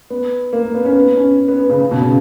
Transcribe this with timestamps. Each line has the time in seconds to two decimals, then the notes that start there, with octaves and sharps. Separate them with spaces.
0.10 B3
0.53 A#3
0.63 A#3
0.75 B3
0.85 C#4
0.96 B3
1.17 C#4
1.48 B3
1.59 B3
1.70 C#3
1.81 C#3
1.91 B2
2.02 C#3